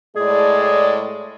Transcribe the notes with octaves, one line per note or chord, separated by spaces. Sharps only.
A2 G#3 G#4 D5